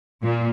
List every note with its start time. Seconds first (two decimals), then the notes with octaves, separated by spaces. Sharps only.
0.23 A#2